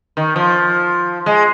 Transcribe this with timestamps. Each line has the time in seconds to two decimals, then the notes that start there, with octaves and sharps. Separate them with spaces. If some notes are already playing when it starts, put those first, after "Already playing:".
0.17 D#3
0.36 F3
1.26 G#3